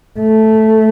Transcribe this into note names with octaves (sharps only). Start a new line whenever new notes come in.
A3